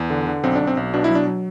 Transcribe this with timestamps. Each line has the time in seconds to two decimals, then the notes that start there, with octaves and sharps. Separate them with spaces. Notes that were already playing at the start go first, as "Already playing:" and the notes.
Already playing: E2
0.10 D3
0.27 D3
0.44 B1 C4
0.55 D4
0.60 B1
0.67 C4
0.77 B1
0.94 B2 D4
1.04 E4
1.10 F#3
1.15 D4
1.27 F#3